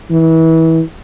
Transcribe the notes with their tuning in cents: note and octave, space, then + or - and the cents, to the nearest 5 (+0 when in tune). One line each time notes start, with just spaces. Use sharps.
E3 -25